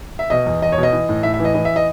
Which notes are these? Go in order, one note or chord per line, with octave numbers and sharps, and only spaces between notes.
E5
B2 D#5
E2
E2 D#5
C#5
B2
D#5
E3
A2
A2 E5
E5
E3 D#5
E3 D#5
E5
D#5